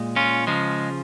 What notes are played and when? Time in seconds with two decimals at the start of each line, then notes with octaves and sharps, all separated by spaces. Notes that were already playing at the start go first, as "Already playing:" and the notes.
Already playing: A#2 G#3
0.16 C#4 F4
0.47 C#3 F3 G#3